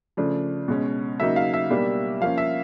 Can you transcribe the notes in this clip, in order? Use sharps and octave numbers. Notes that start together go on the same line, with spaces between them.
C#3 F3 A3 D4
B2 G#3 C#4
C#3 F#3 A#3 D#4 E5
F5
E5
B2 G3 A#3 D4
F3 A#3 C#4 F5
E5